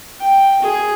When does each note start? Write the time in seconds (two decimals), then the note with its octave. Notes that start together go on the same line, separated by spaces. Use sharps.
0.19 G5
0.62 G#4